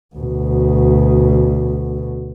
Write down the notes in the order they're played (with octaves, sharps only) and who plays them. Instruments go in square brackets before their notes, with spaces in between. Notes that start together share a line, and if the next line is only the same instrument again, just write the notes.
[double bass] D2 B2